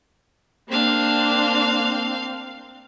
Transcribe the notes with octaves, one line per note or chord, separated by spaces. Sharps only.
A#3 C4 D4 F5